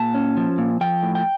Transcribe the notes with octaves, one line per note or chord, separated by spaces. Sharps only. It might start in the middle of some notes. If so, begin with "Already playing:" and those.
Already playing: A#2 A5
C#4
F3
A#2
F3 G5
A2
G5